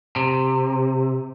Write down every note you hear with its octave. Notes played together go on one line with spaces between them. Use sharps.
C3